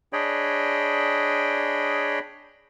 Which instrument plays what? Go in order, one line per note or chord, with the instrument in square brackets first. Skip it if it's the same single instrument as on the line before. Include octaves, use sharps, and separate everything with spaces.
[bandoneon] D4 G#4 C#5 D#5 G5 B5